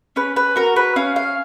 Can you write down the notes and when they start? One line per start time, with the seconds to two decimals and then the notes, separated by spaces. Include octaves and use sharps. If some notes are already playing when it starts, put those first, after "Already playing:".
0.16 C#4 B4
0.36 B4
0.56 F#4 A#4
0.76 B4
0.96 C#4 F5
1.16 F5